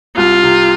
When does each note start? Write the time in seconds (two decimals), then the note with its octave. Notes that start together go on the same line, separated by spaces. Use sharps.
0.17 C2 F4
0.43 C3